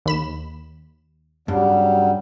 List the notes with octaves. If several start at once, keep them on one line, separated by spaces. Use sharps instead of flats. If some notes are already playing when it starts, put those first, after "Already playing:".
D#2 B5 E7
G2 C#3 F#3 G3